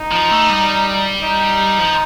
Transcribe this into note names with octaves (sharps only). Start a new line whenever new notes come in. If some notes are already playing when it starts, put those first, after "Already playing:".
Already playing: D#4
F3
A3
G3
D#4
F3